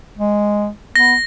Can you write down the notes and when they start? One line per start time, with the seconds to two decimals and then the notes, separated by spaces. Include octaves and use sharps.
0.17 G#3
0.96 B3 A#6